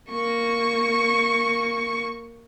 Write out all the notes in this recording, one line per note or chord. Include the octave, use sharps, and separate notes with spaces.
A#3 C#6